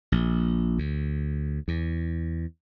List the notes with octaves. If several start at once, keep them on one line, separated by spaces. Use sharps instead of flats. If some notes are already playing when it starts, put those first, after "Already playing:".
A#1
D2
E2